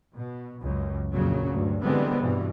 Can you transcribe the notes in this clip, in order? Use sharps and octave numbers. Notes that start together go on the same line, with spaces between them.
B2
C#2 F#2
A#1 F2 A#2 C#3 F#3
D2 G2
D3 E3 G3 G#3 B3 C4
G2 B2 E3